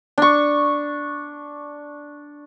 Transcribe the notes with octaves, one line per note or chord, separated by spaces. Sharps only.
D4 C#6